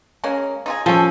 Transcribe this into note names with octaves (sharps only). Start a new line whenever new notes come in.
G#3 A#3 C#4
D#4 F4 G#4
F3 C#4 G#4 A4